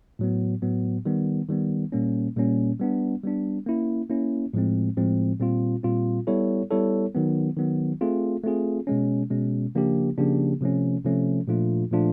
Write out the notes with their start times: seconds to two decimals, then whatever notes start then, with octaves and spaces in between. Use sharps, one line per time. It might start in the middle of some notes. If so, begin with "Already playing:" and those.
0.19 A2 F#3 B3
0.62 A2 F#3 B3
1.05 D#3 G3 B3
1.49 D#3 G3 B3
1.92 A#2 G3 A#3 C#4
2.36 A#2 G3 A#3 C#4
2.80 G3 B3 D4
3.23 G3 B3 D4
3.66 A#3 C#4 E4
4.10 A#3 C#4 E4
4.54 A2 F3 G#3 C4
4.97 A2 F3 G#3 C4
5.40 A#2 G3 C4 F4
5.83 A#2 G3 C4 F4
6.27 G3 B3 E4 A4 C#5
6.71 G3 B3 E4 A4 C#5
7.14 D#3 F#3 B3
7.57 D#3 F#3 B3
8.01 A3 C4 F4 G#4
8.44 A3 C4 F4 G#4
8.87 B2 G#3 C#4
9.31 B2 G#3 C#4
9.75 C#3 F3 A#3 D4 G4
10.18 C#3 F3 A#3 D4 G4
10.61 C3 F3 A3 C#4
11.04 C3 F3 A3 C#4
11.48 A#2 F3 A3 D4 F4
11.91 A#2 F3 A3 D4 F4